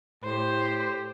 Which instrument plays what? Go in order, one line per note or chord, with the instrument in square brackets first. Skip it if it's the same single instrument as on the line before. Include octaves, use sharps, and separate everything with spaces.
[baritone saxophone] A2 [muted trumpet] G4 [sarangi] C5